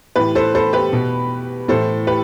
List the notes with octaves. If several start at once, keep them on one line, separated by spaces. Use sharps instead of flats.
A2 E3 G4 B4
A4 C5
A4 C5
G4 B4
B2
A2 E3 A4 C5
G4 B4